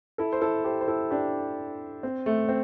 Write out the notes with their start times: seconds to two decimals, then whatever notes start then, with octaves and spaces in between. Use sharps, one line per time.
0.18 E4 A4
0.33 C5
0.41 E4 A4
0.64 G4 C5
0.81 C5
0.88 E4 A4
1.11 D4 G4
2.03 C4
2.26 A3
2.49 C4